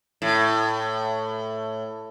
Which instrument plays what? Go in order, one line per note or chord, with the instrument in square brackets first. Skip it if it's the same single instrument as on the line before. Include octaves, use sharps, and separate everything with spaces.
[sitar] A2